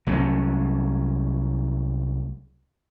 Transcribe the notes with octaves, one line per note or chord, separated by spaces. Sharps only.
C2 F#3 A3 C#4